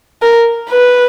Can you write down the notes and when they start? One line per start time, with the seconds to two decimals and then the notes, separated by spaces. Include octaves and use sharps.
0.22 A#4
0.70 B4